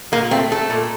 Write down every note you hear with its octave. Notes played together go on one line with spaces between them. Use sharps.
A#2 A#3
A3 C4
A3 A4
A#2